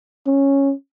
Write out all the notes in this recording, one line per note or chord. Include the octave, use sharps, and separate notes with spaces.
C#4